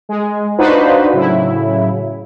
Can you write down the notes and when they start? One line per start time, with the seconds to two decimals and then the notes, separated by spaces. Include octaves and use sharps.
0.09 G#3 G#4
0.58 D4 D#4 F4 F#4 B4 C5
1.13 A2 C#3 F#3 E4